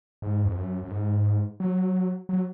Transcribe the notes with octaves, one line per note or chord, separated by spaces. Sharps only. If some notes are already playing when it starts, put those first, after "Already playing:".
G#2
F2
F#2
F#2
G#2
F#3
F#3